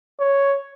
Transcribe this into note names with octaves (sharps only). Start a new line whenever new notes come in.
C#5